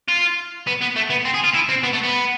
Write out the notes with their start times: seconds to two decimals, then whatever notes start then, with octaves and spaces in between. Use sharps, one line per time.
0.09 F4
0.67 B3
0.81 B3
0.96 A3
1.10 B3
1.25 C4
1.34 G#4
1.44 F4
1.54 E4
1.69 C4
1.83 B3
1.93 A3
2.03 B3